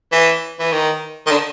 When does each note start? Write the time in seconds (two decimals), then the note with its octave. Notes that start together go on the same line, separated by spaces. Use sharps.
0.12 E3
0.59 E3
0.72 D#3
1.27 D#3
1.31 D3